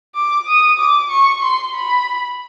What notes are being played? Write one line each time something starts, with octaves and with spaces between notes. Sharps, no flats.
D6
D#6
D6
C#6
C6
B5